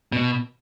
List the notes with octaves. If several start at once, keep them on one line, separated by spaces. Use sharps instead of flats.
B2